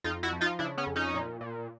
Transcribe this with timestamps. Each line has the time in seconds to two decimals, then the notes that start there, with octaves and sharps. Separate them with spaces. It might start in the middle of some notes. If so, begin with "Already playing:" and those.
0.04 F2 D#4 F4
0.23 E4 F#4
0.32 F3
0.41 D#4 F4
0.59 C#3 D4 E4
0.78 B3 C#4
0.87 F2
0.96 C#4 D#4
1.14 A#2
1.41 A#2